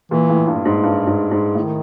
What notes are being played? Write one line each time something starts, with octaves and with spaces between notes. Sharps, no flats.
A#2 E3
A2
G2
G#2
G2
G#2
G#2
A2 D#3